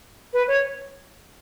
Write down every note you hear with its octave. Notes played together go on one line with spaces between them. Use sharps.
B4
C#5